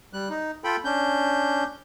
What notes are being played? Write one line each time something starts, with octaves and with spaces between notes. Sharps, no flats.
G3 F#6
D#4
F4 A4 G5 B5
C#4 D4 G6